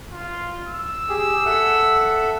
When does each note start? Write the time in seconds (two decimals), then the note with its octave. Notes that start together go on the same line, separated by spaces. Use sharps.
0.11 F4
0.68 E6
1.09 G4 G#4
1.46 A4 E5 F#5